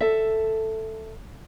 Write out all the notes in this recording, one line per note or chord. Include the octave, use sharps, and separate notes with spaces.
A4 E5